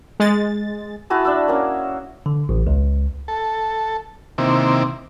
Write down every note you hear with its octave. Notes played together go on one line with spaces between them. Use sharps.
G#3 A6
E4 F#4 G#4 A5
D4 E5 E6
A#3 C#4
D3
A1
C#2
A4
C3 D#3 A#3 C4 E4 D6